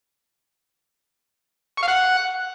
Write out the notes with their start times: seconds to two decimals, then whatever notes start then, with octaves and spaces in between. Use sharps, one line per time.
1.77 C#6
1.83 F5
1.88 F#5